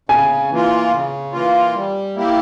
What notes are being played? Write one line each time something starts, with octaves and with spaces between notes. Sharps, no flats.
C#3 G#5
E3 A#3 F4
C#3
E3 A#3 F4
G3
A#3 E4 G4